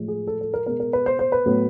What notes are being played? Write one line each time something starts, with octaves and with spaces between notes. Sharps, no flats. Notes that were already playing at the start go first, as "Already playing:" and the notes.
Already playing: A2 F3 G#3
G#4
A4
A4
A#4
B2 G#3 B3 A#4
A#4
B4
C5
C5
B4
A2 F#3 B3